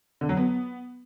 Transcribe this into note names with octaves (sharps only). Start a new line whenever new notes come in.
D3
F#3
B3